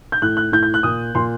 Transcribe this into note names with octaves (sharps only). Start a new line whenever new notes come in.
G6
A2 F#6
F#6
A2 G6
G6
F#6
A#2 D#6
A#2 C6